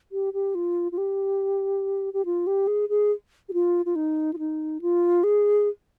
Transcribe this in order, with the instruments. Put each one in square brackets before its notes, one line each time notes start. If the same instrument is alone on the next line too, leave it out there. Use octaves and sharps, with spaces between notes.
[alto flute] G4
G4
F4
F4
G4
G4
F4
G4
G#4
G#4
G4
F4
F4
D#4
F4
D#4
F4
G#4